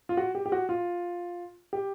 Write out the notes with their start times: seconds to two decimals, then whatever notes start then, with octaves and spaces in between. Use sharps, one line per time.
0.09 F4
0.17 F#4
0.35 G4
0.46 G4
0.52 F#4
0.69 F4
1.73 G4